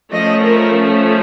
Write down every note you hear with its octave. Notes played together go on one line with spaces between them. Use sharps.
F3 A3 C#4 D#5
A#4